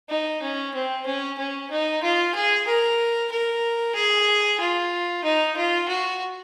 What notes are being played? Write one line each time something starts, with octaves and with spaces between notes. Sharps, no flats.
D#4
C#4
C4
C#4
C#4
D#4
F4
G#4
A#4
A#4
G#4
F4
D#4
F4
F#4